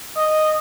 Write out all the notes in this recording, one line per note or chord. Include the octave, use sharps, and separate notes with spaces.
D#5